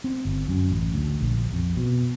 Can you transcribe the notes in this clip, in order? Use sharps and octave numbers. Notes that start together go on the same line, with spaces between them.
C4
G1
F#2
A1
D2
A#1
F2
B2